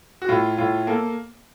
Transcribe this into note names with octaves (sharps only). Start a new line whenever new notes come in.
F#4
A2 F4
A2 F4
A#3 A4